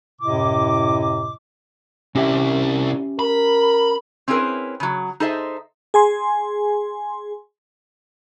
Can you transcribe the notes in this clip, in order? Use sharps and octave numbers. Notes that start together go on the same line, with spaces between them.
F#2 A2 C3 E4 D#5 D6
C3 C#4 E4 G4 E5
A#4 B5
C4 C#4 E4 G#4 A#4 B4
C#3 F#3
D#4 G#4 A4 C5 D#5 E5
G#4 G#5 C6